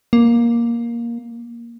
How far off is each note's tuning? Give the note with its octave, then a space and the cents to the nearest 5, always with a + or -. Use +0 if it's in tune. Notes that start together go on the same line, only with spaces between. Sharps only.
A#3 +10